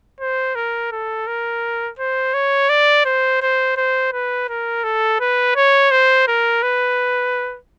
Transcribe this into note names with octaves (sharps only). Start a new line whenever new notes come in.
C5
A#4
A4
A#4
C5
C#5
D5
C5
C5
C5
B4
A#4
A4
B4
C#5
C5
A#4
B4